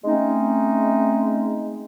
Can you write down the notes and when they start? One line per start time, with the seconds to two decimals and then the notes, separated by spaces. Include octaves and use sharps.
0.04 G#3 A3 C4 C#4 D#4